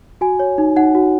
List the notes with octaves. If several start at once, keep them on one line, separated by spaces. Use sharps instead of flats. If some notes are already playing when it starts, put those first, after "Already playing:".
F#4 G#5
C#5
D#4
D#4 F#5
F#4